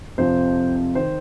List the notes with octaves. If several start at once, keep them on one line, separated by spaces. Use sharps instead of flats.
F2 C3 F3 C5
D#3 C5